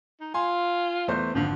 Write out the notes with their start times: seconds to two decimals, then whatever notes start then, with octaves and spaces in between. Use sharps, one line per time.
0.21 D#4
0.34 F4 G#5 C6
1.08 E2 A3 C5
1.34 G#1 F2 D3 F3